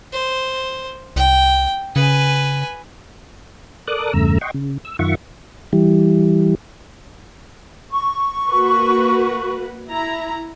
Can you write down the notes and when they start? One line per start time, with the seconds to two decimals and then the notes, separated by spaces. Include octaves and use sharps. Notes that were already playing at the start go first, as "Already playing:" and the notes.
0.13 C5
1.16 C2 G5
1.96 C#3 B4 G#5
3.88 A4 A#4 D5 D6 D#6 F#6
4.13 E2 G2 C#3 A3 A#5 E6
4.41 D#5 F#5 G5 C6 C#6
4.54 C#3
4.85 E6
4.99 F#2 D#3 F4 E5 F#5 C#6
5.73 E3 G3
7.90 C#6
8.49 A#3 F#4 B4
9.89 E4 A#5